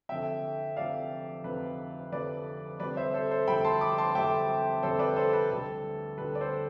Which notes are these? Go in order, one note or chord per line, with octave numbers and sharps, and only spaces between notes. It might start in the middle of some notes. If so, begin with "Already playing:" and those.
F1 F2 D3 E5 G5
F1 F2 D3 D5 F5
F1 F2 D3 B4
F1 F2 D3 B4 D5
F1 F2 D3 G3 B4 D5
C5 E5
A4 C5
A4 C5
F1 F2 D3 G3 G5 B5
A5 C6
B5 D6
A5 C6
F1 F2 D3 G3 E5 G5
F1 F2 D3 G3 A4 C5
B4 D5
A4 C5
B4
D2 D3 G3 A4
D2 D3 G3 B4
D5
A4 C5